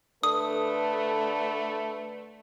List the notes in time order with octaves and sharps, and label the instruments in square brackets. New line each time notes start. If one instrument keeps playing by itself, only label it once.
[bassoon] D3 [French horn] A3 [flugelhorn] B4 [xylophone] D#6